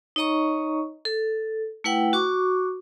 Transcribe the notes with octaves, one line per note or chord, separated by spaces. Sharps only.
D#4 C#5 D#5 A#5 C#6
A4
A3 E4 B4 F#5 G5
F#4 C#6 D6